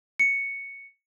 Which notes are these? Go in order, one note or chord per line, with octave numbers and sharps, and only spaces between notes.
C#7